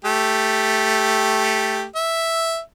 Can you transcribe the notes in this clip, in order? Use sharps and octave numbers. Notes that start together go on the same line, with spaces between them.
A3 G4
E5